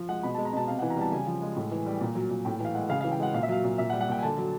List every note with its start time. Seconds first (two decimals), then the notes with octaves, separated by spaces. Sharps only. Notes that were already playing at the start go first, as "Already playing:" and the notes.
Already playing: F3
0.09 G#3 F#5
0.23 B2 B5
0.34 G#3 A5
0.45 A#5
0.53 B2 A5
0.68 C3 F5
0.79 E3 F#5
0.90 A#5
0.97 G3 A5
1.12 C#3 G#5
1.27 F3
1.42 G#3
1.56 A2
1.71 E3
1.86 G3
2.01 A#2
2.15 F#3
2.30 A#2
2.45 A2 G5
2.60 E3 F5
2.75 G#3 F#5
2.89 C#3 F5
3.01 E3 F5
3.12 G5
3.19 G#3 F#5
3.34 A#2 F5
3.43 E5
3.48 F#3 F5
3.64 A#2
3.78 A#2 E5
3.90 F#5
3.93 G3
4.01 F#5
4.08 A#2 G5
4.19 G#5
4.23 D3 A5
4.38 F#3